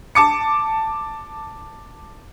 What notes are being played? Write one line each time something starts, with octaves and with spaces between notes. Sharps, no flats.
A5 D6 C#7